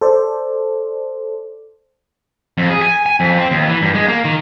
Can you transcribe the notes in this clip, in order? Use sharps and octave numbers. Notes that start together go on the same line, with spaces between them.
A4 C5 D5
F2
G#4
G#5
G#5
F2
C4
D#2
E3
G2
G#3
A#3
D#3